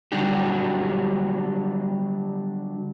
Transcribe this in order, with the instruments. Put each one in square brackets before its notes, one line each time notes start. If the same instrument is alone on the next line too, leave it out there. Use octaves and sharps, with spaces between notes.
[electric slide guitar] D3 F#3 G3 D4 F#4 G4